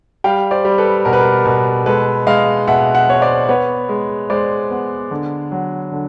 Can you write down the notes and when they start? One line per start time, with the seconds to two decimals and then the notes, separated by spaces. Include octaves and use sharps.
0.24 G3 F5 G5
0.51 C5 D5
0.65 G3
0.78 A4 B4
1.05 B2 A#4
1.13 B4
1.21 A#4
1.45 B2 A#4
1.86 G#3 A4 B4
2.27 G#3 D#5 F5
2.67 B2 E5 F#5
2.95 E5 F#5
3.08 B3 C#5
3.22 C5 D5
3.49 B3 B4 C#5
3.89 G#3
4.30 G#3 C5 D5
4.70 B3
5.11 D3
5.52 F#3
5.92 D3